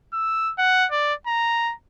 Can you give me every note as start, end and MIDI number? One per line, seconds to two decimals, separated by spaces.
0.14 0.53 88
0.58 0.87 78
0.92 1.14 74
1.27 1.73 82